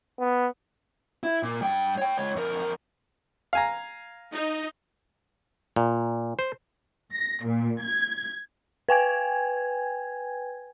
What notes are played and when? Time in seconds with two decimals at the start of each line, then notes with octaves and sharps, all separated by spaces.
0.19 B3
1.24 E4
1.43 A#2
1.62 G2 G5
1.98 C#5 G5
2.18 G#3 C#5
2.36 F2 A#4
3.53 F5 G#5 A#5
4.35 D#4
5.76 A#2
6.39 C5
7.13 A#6
7.45 A#2
7.82 G#6
8.89 B4 G5 G#5 G#6